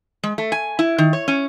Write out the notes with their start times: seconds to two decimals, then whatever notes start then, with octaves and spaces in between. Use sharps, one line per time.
0.23 G#3
0.38 A3
0.52 G#5
0.79 E4
0.98 D#3
1.13 C#5
1.28 C#4